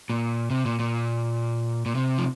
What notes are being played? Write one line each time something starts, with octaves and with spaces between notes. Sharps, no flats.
A#2
C3
A#2
A#2
A#2
C3
F3